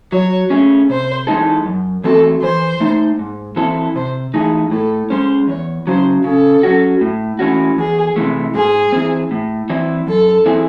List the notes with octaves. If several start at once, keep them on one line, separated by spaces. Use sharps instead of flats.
F#3 C#5
A3 C#4 G#4
C3 C5
E3 G#3 D#4 A4
F#2
E3 A3 C4 F#4 A4
E3 C5
A3 D#4
G#2
E3 C4 E4 A4
C3 C5
E3 A3 D#4 G#4
A2 A4
G#3 C#4 C5
E2 C#5
C#3 F#3 C5
C#3 A4
F#3 C#4 F#4
A2
E3 A3 C#4 F#4
E2 G#4
C3 E3 A3
G#2 G#4
E3 C4
A2
E3 C4 E4
F#2 A4
E3 C4 E4 G#4